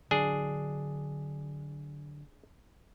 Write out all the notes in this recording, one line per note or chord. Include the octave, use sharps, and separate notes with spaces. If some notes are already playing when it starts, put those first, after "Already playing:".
D3 F#3 D4 G#4